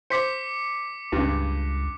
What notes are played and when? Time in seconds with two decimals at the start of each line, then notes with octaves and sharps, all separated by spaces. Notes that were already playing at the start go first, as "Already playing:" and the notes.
0.10 C5 D6 B6 C#7
1.12 C#2 G2 C#3